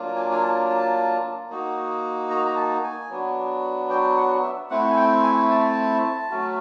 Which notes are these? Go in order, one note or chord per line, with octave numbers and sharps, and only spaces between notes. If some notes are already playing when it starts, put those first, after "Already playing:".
Already playing: F#3 A#3 D4 F4
G#5
G#5
A5
A5
A#3 D#4 F#4
A#5
A#5
A5
G#5
F#3 B3 D4 F#4
G5
F#5
E5
A3 C4 E4 F#5
G#5
G5
G#5
A5
F#3 A3 C#4 F#4